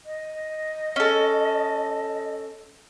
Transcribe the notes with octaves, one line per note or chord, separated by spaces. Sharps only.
D#5
C#4 A4